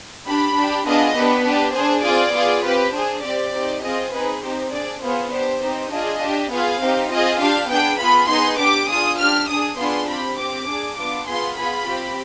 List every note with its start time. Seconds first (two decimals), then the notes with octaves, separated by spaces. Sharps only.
0.25 D4 G4 B5
0.54 D4 G4
0.84 B3 D4 F4 G#4 D#5
1.14 B3 D4 G4 B4
1.44 D4 G4
1.73 D4 G#4 C5
2.03 C4 F4 G#4 D5
2.33 B3 F4 G#4
2.63 C4 G4 B4
2.93 D4 G#4 C5
3.23 C4 G4 D5
3.53 C4 D#4 G4
3.82 C4 F4 G#4 D#5
4.12 C4 D#4 G#4 B4
4.42 C4 D#4 G4 C5
4.72 D4 G#4 D5
5.01 B3 F4 G#4 C5
5.31 D4 G4 C5
5.61 C4 D#4 G4
5.91 D4 F4 G#4 D#5
6.20 D4 G4
6.50 B3 F4 G#4 F5
6.80 C4 D#4 G4
7.10 C4 F4 G#4 D#5
7.40 D4 G4 F5
7.69 B3 D4 G#4 G5
7.99 B3 F4 G#4 B5
8.29 B3 D#4 G#4 C6
8.59 D4 G4 D6
8.88 D4 F4 G#4 D#6
9.19 D4 G4 F6
9.48 D4 G#4 D#6
9.77 B3 D4 F4 G#4 C6
10.07 C4 G4 B5
10.38 C4 G4 D6
10.68 D4 G#4
10.97 B3 D4 F4 D6
11.27 B3 F4 G#4 C6
11.57 B3 F4 G#4 B5
11.87 C4 G4